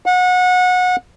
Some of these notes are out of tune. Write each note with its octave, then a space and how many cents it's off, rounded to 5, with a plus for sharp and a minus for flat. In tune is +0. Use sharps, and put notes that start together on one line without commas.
F#5 -25